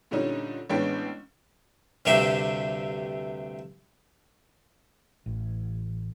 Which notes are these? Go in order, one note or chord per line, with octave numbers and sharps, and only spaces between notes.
A#2 D3 G3 C#4 D#4
A1 G#3 B3 C#4 D4 G5
D2 G2 C3 A3 G4 E5
A1